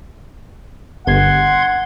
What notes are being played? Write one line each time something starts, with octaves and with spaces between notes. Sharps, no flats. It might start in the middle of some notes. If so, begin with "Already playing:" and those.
G1 F#5 C6 G#6